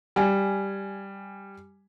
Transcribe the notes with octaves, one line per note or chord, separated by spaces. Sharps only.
G3 G#5